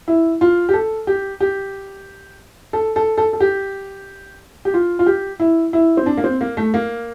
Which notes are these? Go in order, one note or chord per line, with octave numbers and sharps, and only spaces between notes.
E4
F4
G4
A4
G4
G4
A4
A4
A4
A4
G4
G4
F4
F4
G4
E4
E4
C4
D4
A#3
C4
A#3
A3
A#3